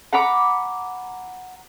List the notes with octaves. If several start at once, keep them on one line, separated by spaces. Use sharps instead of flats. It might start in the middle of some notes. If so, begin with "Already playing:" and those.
F#5 A#5 B5 D6